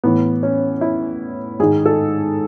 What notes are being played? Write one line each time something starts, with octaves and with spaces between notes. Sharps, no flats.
A2 E3 B3
C#4
E4
G#2 D#3 G#4
A4